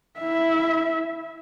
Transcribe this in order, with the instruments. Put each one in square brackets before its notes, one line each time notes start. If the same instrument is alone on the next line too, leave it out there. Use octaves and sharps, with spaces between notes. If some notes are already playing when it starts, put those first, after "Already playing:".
[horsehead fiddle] E4 E5